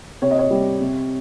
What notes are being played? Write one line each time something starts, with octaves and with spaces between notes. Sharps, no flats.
C3 C#5
D#5
C#5
G3
C3